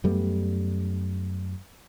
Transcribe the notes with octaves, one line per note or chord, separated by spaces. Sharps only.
F#2 G3 A3 B3